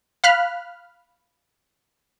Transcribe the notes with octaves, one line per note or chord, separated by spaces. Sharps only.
F5 B5 F6 F#6